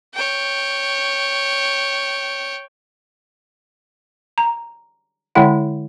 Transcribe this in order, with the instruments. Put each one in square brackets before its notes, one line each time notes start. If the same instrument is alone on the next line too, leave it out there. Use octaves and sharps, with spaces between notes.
[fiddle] C#5 G5
[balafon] A#5
D3 G#3 E4 C#5 F#5 G5